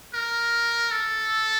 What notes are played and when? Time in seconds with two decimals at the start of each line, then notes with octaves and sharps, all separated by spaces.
0.14 A#4
0.91 A4